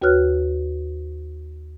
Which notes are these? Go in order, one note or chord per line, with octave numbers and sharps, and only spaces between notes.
D#2 F#4 B4 C#5 F6 F#6